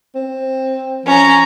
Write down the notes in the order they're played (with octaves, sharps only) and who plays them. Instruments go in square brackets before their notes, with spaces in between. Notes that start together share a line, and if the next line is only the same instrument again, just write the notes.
[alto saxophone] C4
[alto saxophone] F3 [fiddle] C#4 A#5